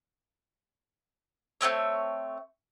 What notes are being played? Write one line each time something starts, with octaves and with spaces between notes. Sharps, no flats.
A3 A#3 C4 C#5